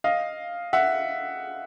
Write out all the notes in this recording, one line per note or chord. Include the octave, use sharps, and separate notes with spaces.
D#5 F5
E5 F#5